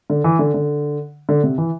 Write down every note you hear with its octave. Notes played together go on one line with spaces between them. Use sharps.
D3
E3
D3
D3
D3
C3
E3